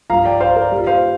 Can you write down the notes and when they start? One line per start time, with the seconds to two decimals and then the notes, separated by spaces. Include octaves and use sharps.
0.10 G2 F3 F5 A#5
0.25 D5 G5
0.40 C5 F5
0.56 A#4 D5
0.71 A#2 G3
0.87 C5 F5